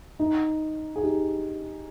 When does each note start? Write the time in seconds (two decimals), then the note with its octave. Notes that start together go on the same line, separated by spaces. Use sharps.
0.19 D#4
0.96 G#4
1.03 D#4 G4